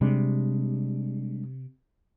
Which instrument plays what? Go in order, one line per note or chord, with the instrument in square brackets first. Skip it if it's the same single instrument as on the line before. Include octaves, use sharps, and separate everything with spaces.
[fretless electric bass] C3 [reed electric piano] G3 G#3 D4